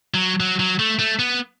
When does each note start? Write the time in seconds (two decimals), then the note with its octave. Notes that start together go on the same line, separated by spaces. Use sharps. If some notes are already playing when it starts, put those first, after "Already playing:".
0.14 F#3
0.40 F#3
0.60 F#3
0.79 A3
0.99 A3
1.19 B3